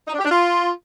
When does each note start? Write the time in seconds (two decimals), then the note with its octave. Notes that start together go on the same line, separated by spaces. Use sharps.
0.07 D#4
0.13 D4
0.19 G4
0.24 D4
0.30 F4